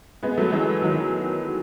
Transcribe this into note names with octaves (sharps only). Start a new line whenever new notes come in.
G#3 B3
F#3 A3
E3 G#3
D#3 F#3